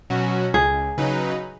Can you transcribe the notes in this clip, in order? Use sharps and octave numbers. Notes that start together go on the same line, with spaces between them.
B2 F#3 C#4 F#4
C#2 G#4
C#3 F#3 D#4 B4